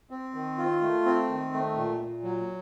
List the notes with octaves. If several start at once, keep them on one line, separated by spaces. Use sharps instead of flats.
C4
D#3
F4
A3
C4
D#3
A3
A#2
A#2
F#3